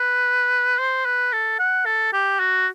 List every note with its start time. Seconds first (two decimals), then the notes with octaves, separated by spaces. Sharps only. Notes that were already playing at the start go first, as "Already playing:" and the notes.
Already playing: B4
0.79 C5
1.06 B4
1.33 A4
1.59 F#5
1.86 A4
2.13 G4
2.40 F#4